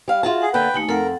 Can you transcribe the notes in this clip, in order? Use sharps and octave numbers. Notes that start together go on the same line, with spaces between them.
G3 F5
F4 F#4 G#4 E5 A5 C6
G#4 F#5
D3 A#3 A4 B4 G5
D#2 A3 D#4 G#5
F2 A4 A#4 F#5